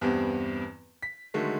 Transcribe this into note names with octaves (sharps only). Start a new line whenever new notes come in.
E2 G2 E3 G3 B3 C4
B6
D3 D#3 F#3 G#3 A3